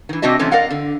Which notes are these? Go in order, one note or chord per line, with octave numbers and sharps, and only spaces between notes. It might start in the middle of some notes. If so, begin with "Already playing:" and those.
D#3 E3
C3 C4 D4 F#4 D#5 E5
C3 E3 F#3 A3 C4 C#4
A#4 D5 D#5 F5 F#5
D3